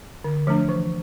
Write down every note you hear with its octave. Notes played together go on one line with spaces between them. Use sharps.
D3
F3 A3 D4
E3